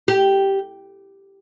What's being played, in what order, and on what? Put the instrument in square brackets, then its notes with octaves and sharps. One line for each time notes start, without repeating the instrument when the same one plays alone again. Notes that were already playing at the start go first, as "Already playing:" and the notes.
[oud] G4